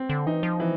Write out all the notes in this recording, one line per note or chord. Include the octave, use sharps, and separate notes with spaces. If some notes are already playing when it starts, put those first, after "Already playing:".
Already playing: C4
D3
E3 D#4
F3
E3